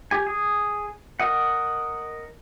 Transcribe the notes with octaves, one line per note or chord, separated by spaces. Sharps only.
G4 G#5
G#4
A#4 D#5 F#5